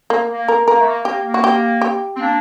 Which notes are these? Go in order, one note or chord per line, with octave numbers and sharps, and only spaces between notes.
A#3
A#3
A#4
A#3 A#4
A3
A#3
A#3 G4
A#3
F#4
G4
G4
C4
A#3 D4